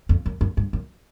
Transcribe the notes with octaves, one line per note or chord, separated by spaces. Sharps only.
F2
F#2
F#2
G2
F#2